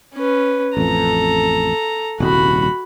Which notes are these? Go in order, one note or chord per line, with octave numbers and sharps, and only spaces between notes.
C#4 B4
A1 F2 A4 A#5
D#1 C2 F#4 B5